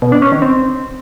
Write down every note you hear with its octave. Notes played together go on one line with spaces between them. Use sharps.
B2
D4
C#4
D#3
C4